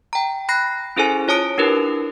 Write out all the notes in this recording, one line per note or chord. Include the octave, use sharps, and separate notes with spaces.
G5 A#5
B5 F#6 A#6 C7
C#4 E4 G#4 A4 C5 G#5
F4 C#5 A5 D#6 D7
D4 E4 G4 A#4 B4